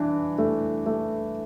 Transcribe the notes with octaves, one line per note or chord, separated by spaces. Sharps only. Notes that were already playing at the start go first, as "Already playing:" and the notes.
Already playing: E3 D4
A3
A3